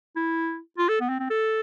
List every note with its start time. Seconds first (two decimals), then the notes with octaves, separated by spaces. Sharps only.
0.16 E4
0.78 F4
0.89 A4
1.01 B3
1.09 C4
1.19 C4
1.30 A4